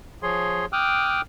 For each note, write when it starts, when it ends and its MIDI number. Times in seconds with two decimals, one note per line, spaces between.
0.23 0.66 53
0.23 0.66 68
0.23 0.66 73
0.23 0.66 84
0.73 1.21 79
0.73 1.21 86
0.73 1.21 87
0.73 1.21 89
0.73 1.21 90